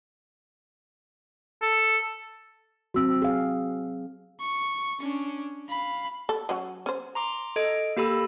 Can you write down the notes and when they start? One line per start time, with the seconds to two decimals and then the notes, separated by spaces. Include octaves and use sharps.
1.62 A4
2.94 F#3 C4 F#4 E6
3.22 G#4 F5
4.40 C#6
5.00 C#4 D4
5.68 F5 B5
6.29 A4
6.49 F#3 C#4 F#4
6.86 C#4 C5
7.15 A#5 C6 D6
7.56 A4 D#5 G#6 D7
7.97 A#3 G4 A4 B5 E6